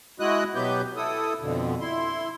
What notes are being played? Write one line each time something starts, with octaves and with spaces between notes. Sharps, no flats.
G#3 E4 F#4 D#5 D#6 F#6
B2 F#3 B3 G4 B4 G6
E4 A4 D#6
F2 B2 D3
E4 C6